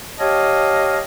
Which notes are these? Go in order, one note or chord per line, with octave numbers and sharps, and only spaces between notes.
G4 C#5 D#5 F5 A5